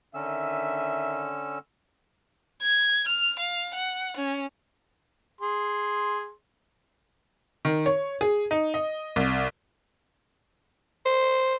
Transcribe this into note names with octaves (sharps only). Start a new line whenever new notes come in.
D3 D#3 C#4 E5 E6
G#6
F6
F5
F#5
C#4
G#4 C6
D#3
C#5
G#4
D#4
D#5
C2
C5